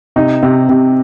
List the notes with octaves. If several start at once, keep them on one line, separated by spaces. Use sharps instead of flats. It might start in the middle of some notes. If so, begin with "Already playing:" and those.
C3 D#4
C3
C3